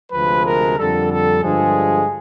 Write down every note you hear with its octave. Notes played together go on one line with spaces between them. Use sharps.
D2 C3 F3 G#3 B4
A#4
F2 D3 G3 A4
A4
G2 D3 F3 G#3 G#4